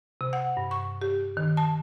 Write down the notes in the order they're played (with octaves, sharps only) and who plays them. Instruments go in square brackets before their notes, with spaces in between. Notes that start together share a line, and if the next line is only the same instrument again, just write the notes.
[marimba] C3
F#5
G2
C#6
G4
D#3
A5